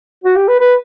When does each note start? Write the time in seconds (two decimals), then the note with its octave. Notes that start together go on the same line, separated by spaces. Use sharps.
0.24 F#4
0.36 G4
0.48 B4
0.60 B4